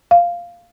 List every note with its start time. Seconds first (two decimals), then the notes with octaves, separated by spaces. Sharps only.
0.11 F5